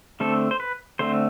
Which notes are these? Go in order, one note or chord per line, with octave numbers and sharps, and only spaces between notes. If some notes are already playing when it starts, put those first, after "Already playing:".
D3 A3 C4 A4
C5
B4
D3 A3 C4 C5